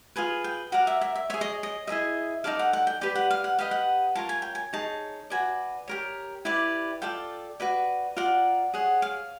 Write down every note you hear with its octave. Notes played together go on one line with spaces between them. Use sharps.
F4 G#4 B4 G#5
G5
F#4 A#4 D5 F#5
E5
E5
E5
G#4 C#5 E5
D#5
D#5
E4 G#4 B4 D#5 E5
D#4 F#4 A4 D5 F5
F#5
F#5
G5
G4 B4 D5 G5
F#5
F5
F#5
G4 B4 D#5 F5
F#5
F4 A#4 C#5 A5
G#5
G5
G#5
D#4 G#4 C#5 A5
F#4 B4 D5 G#5
G4 A#4 C#5
E4 G4 B4 D5
F4 A4 D5 G5
F#4 B4 D5
F4 A#4 D5 F#5
G#4 C#5 F#5
F5